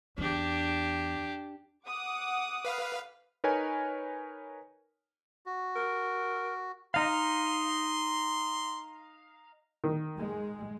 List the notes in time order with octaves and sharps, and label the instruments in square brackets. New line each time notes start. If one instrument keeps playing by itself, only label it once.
[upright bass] E2 [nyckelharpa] D4 G4
[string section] F#5 D6 D#6
[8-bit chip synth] B4 F5
[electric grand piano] D#4 A#4 B4 C#5 G#5
[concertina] F#4
[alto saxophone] A#4
[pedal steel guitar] D#4 F5 [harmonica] C6
[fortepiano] D#3
[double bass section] G#3